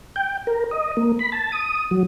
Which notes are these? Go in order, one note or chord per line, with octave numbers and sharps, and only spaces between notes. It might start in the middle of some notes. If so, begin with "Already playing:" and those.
G5
A#4
D#5
A#3
B5
A5
D#6
F#3